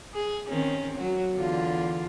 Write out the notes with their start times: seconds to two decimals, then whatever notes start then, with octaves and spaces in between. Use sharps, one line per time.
0.14 G#4
0.48 D#3 C4 C#4
0.97 F#3 F#4
1.34 E2 D3 F4